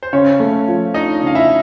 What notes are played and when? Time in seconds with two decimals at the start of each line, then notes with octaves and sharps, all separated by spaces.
0.03 C5
0.13 C#3 C#4 C#5
0.40 A3
0.68 F3
0.94 D4 D#4 D#5
1.21 C#3
1.27 F5
1.35 E4 E5